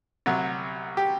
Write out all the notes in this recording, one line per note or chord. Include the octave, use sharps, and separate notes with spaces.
C2 C3 F#3
G4